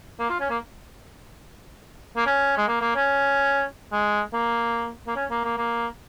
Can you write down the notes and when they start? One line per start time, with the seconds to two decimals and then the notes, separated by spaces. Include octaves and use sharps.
0.19 A#3
0.29 F4
0.40 C#4
0.50 A#3
2.17 A#3
2.26 C#4
2.57 G#3
2.68 A#3
2.81 A#3
2.95 C#4
3.92 G#3
4.33 A#3
5.07 A#3
5.16 C#4
5.30 A#3
5.44 A#3
5.58 A#3